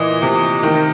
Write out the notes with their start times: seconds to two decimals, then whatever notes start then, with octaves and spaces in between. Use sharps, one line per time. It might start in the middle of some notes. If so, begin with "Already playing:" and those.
Already playing: A#2 E3 D#5
0.22 C3
0.63 D#3